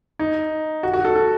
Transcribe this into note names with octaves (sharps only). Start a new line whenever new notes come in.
D#4
F#4
F#4
A4
A4